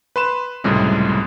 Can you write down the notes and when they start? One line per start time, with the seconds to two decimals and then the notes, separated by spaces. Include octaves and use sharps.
0.16 B4 C6 E7
0.64 C#2 F#2 A2 C3 G3 G#3